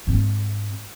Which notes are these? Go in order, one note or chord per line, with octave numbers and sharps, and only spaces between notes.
G#2 C4